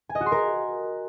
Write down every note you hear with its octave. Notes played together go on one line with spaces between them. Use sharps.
G#5
D#5
F#4
C6
A#4